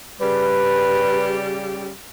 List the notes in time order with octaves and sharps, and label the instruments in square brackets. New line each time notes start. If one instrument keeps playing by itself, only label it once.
[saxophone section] C#3 G3 [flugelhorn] B4